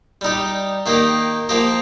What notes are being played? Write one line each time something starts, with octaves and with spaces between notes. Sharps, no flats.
G3 D#4 G4
D#3 A#3 G4 D#5
F3 A#3 G4 D#5